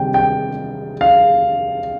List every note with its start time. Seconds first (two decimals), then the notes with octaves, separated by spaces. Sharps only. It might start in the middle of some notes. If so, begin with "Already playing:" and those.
Already playing: C3 D#3 G3 G5
0.14 G5
1.01 F5